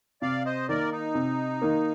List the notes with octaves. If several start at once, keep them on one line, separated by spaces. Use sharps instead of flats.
C3 D5 F5
C5 D#5
D#3 A#3 A#4 D5
D#4
C3
D#3 A#3